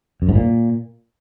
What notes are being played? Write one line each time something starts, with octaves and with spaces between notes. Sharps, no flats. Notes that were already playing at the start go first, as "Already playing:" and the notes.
F#2
G#2
A#2